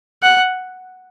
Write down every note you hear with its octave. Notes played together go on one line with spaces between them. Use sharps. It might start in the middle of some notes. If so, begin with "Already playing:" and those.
F#5